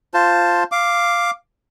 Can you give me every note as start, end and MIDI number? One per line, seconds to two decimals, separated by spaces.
0.14 0.64 65
0.14 0.64 72
0.14 0.64 81
0.72 1.31 77
0.72 1.31 86